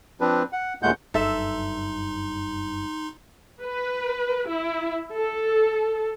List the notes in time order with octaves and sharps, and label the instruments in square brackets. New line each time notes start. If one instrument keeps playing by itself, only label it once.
[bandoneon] F3 C4 D4 B4
F#5
D#2 A#2 G#3 A3 F#5 G6
[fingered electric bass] F#1 G2 [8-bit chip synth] D#4 C6 [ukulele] A4 E5
[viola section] B4
E4
A4